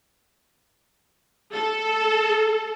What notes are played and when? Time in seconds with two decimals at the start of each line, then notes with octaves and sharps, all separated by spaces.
1.53 A4